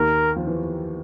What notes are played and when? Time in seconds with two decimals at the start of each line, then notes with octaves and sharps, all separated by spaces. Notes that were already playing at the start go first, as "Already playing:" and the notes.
Already playing: D#2 D#3 A#4
0.36 F3
0.47 E3